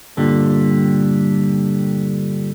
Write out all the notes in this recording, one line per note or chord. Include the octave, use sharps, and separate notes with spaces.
G2 A#2 D3 G3